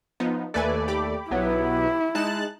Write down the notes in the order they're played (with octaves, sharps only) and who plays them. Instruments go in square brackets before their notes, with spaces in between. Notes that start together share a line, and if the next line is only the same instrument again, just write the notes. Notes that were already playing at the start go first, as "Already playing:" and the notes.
[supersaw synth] F3 B3 D#4
[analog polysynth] D#2 A3 D5 [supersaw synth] A4 B4 G#5
[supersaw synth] G4 B5 D6
[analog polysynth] B1 F#3 B3 [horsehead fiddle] E4
[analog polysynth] G#3 A5 F#6 [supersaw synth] D#4